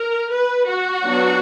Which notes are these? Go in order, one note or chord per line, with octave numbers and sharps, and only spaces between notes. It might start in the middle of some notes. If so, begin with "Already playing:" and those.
Already playing: A#4
B4
F#4
F#3 B3 D4